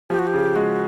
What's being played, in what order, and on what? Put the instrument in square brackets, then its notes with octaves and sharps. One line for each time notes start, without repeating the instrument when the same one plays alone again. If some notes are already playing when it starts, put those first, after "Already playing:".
[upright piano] F3 [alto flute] G4
[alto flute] F#4
G4
[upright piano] C#3
[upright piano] G#3 [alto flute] F#4